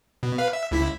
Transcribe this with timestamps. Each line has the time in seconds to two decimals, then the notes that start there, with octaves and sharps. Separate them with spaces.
0.23 B2
0.38 B4 F5
0.53 E5
0.71 C#2 E4 B6